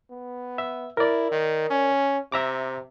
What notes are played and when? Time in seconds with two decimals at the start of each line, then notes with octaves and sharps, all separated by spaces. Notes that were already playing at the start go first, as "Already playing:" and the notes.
0.10 B3
0.58 E5
0.97 E4 A#4 D5
1.31 D#3
1.70 C#4
2.32 C3 E5 A#5 D6